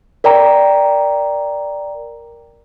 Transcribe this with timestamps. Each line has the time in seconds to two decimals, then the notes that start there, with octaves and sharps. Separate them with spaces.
0.24 A#4 D5 G5 A#5